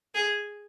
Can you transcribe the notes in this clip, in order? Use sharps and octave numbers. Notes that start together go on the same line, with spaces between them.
G#4